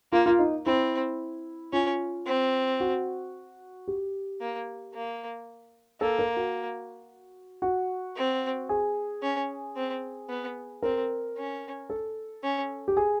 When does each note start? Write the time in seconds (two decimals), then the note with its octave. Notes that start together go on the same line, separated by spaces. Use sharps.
0.12 A#3 F4
0.26 F4
0.39 D#4
0.65 C4 E4
1.72 C#4 F4
2.27 C4
2.80 F#4
3.88 G4
4.41 A#3
4.94 A#3
6.01 A#3 A4
6.19 A#4
6.36 F#4
7.62 F#4
8.16 C4
8.69 G#4
9.22 C#4
9.76 C4
10.29 B3
10.83 C4 A#4
11.37 C#4
11.90 A4
12.43 C#4
12.88 G4
12.97 G#4